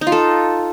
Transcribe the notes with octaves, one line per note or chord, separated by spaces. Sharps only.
D#4
F4
A4